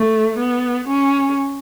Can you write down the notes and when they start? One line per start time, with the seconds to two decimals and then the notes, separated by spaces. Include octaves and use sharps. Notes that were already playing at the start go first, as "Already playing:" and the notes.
Already playing: A3
0.39 B3
0.89 C#4